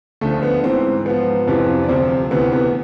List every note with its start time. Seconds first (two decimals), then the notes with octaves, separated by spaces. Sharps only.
0.21 D2 D3 F3 A3
0.43 B3
0.64 G#2 E3 C4
1.05 G#2 F3 B3
1.47 F2 C3 E3
1.83 D4
1.89 D2 C3 F3 C4
2.31 D2 C3 E3 B3
2.52 B3